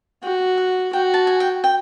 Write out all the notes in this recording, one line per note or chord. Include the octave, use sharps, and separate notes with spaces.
F#4 G5
F#5
F#4 G5
A5
G#5
G5
G5